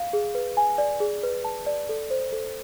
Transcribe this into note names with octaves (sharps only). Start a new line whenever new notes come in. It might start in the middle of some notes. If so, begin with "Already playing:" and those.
Already playing: F5
G#4
B4
G#5
D5
G#4
B4
A5
D5
A4
C5
A4